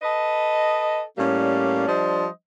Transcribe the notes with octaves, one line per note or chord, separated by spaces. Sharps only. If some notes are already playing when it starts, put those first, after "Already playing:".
A4 B4 D#5
A2 G3 A#3 C#4 D5
F3 G3 D4 C5 D#5